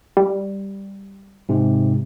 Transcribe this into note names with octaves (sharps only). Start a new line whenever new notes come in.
G3
G#2 C3